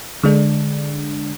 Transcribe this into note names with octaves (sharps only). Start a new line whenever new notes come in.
D3 G#3 D4